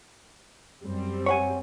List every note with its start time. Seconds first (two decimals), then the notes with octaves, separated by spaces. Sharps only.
0.83 F#2 G3 C4
1.26 C#5 F#5 G#5